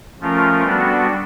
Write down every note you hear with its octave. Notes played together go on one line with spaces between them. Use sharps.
F3 A3 C#4 F4 A#4
G3 B3 D4 F#4 A4